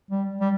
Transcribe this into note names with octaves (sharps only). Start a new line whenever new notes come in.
G3
G3